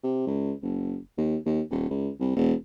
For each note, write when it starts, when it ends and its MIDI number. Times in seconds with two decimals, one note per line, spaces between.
0.03 0.22 48
0.27 0.52 37
0.62 0.96 30
1.18 1.36 39
1.46 1.61 39
1.70 1.88 27
1.90 2.09 37
2.20 2.34 36
2.36 2.53 28